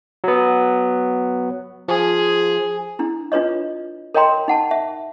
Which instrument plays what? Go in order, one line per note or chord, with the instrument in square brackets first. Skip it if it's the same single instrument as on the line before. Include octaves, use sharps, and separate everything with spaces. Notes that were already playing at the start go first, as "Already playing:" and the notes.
[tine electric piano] F#3 B3
[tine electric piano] F3 [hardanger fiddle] G#4
[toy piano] D4 E4
D4 F4 B4 C#5 D#5
A#4 C#5 D#5 G5 A#5 C6
D#4 F#5 A5
E5